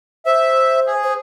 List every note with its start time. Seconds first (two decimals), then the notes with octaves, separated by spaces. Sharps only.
0.26 C5 E5
0.87 G#4
1.04 C5